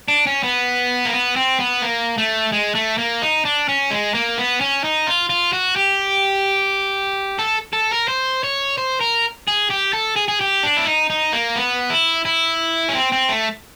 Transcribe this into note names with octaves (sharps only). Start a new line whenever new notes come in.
D4
C#4
B3
A#3
B3
C4
B3
A#3
A3
G#3
A3
A#3
D#4
D4
C#4
G#3
A#3
B3
C#4
D#4
F4
F4
F#4
G4
A4
A4
A#4
C5
C#5
C5
A#4
G#4
G4
A4
G#4
G#4
G4
D4
E4
D#4
D#4
A#3
B3
E4
E4
C#4
C4
C4
A3